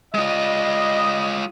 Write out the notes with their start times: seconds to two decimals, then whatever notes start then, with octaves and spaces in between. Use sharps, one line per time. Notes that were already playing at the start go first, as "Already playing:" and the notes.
0.15 G3 G#3 F4 D#5